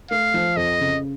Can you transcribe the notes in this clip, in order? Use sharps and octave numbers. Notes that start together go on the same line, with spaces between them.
A3 F5
F3
F2 D#5
C#3